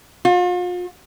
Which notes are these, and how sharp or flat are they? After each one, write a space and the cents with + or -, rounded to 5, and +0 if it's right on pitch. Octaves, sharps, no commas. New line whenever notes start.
F4 +40